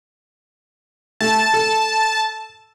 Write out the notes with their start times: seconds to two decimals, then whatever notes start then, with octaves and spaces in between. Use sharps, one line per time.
1.21 A3 A5
1.54 A4